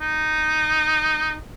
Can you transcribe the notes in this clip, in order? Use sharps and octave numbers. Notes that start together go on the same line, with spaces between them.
D#4